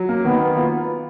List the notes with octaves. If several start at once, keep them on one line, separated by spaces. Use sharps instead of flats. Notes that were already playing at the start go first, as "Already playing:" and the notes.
Already playing: F#3
A#3
D#3 B3
A#3
F4